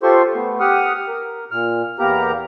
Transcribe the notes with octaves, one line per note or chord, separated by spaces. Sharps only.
F4 G4 A4 C5 C6 C#6
A3 B3
G4 F#5 D#6 F6
A#4
A#2 F6
E2 A#3 B3 G4 A#4 A#5